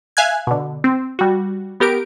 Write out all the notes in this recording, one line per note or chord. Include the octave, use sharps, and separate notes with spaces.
E5 F5 G#5 F#6 G#6
B2 D3
C4
G3 F#4
B3 G4 A#4 D7